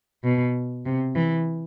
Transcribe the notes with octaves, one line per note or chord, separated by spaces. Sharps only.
B2
C3
E3